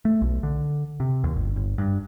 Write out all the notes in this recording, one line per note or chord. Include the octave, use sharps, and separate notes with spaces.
A3
B1
D3
C3
D#2
G1
G1
G2